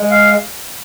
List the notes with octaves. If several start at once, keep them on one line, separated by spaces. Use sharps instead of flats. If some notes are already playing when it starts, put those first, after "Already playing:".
Already playing: G#3
F5